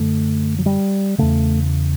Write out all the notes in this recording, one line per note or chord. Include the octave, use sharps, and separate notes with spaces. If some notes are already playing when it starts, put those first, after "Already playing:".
Already playing: F#2 D3 A3
F#3
G3
E2 C#3 A3